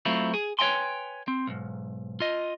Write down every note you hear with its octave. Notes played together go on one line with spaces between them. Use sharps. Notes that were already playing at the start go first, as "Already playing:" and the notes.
F#3 A3 C4 E4 F4
G#4
B4 C#5 D#5 G5 G#5 C6
C4
B1 G#2
F4 D#5